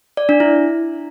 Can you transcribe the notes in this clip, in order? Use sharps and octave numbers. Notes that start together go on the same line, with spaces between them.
D5
D4
E4